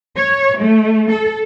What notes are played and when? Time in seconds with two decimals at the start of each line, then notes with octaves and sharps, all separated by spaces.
0.16 C#5
0.58 A3
1.11 A4